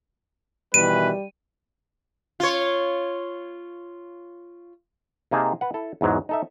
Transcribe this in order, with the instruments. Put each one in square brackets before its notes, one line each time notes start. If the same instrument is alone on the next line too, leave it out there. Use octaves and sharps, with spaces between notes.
[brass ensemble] B2 D#3 E3 [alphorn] G3 [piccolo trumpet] B4 [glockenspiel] D#7
[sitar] F4 C#5
[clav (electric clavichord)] C3 A#3 D#4 G#4 A#4 A5
B4 F#5
E4 A4
E2 G#2 F#3
D#4 A4 E5